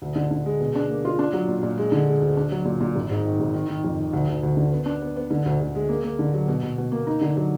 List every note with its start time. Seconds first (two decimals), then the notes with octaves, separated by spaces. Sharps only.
0.02 D2
0.16 D3
0.31 D3
0.46 G#3
0.60 B2
0.75 D4
0.89 A#3
1.05 F4
1.19 D4
1.33 F#3
1.48 A#2
1.63 A#2
1.78 G#3
1.92 D3
2.08 G#3
2.21 D2
2.37 D4
2.52 F#3
2.65 A#2
2.80 A#2
2.96 G#1
3.10 G#2
3.25 D#3
3.40 G#1
3.54 D#3
3.69 D#3
3.84 F2
3.98 D#3
4.13 D2
4.28 D2
4.43 D2
4.57 D3
4.72 B3
4.86 D4
5.02 B3
5.16 B3
5.31 D3
5.46 D2
5.60 D2
5.75 G#3
5.89 A#3
6.04 A#3
6.19 D3
6.34 F#3
6.48 B2
6.63 B2
6.78 B2
6.92 A#3
7.07 D#4
7.21 D3
7.37 F#3